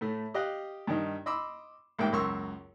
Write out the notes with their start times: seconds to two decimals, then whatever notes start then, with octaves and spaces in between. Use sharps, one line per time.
0.01 A2 A3
0.34 G4 D#5 F5 F#6
0.87 G2 D#3 D#4
1.26 D#5 B5 C6 D6 E6
1.99 A1 G#2 A#3 E5 G5
2.12 C#2 F#2 A#4 C6 C#6 E6